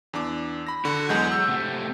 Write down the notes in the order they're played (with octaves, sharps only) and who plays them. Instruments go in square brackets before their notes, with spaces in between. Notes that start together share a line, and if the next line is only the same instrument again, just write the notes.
[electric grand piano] E2 D4 D6
B5 A#6
[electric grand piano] D3 [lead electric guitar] F#4
[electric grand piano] E2 G#3 G6 [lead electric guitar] F#3 F#4
[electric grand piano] E6 G6
[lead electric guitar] C3 A3